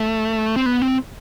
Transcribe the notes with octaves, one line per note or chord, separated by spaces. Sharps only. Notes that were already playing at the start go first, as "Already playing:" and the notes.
Already playing: A3
C4
B3
C4